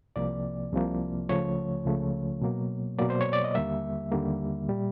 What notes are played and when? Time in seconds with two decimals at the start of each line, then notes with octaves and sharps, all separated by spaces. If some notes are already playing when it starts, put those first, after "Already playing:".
0.16 C2 C3 F3 A#3 D5
0.73 C2 C3 F3 A#3
1.29 C#2 C#3 F3 A3 C#5
1.86 C#2 C#3 F3 A3
2.42 B2 F#3 A#3
2.99 B2 F#3 A#3 D5
3.10 C5
3.21 C#5
3.33 D5
3.44 D#5
3.55 D#2 D3 G3 A#3 E5
4.12 D#2 D3 G3 A#3
4.69 A#2 G3